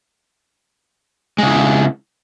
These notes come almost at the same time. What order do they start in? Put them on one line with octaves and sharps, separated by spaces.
G#3 C#3 E4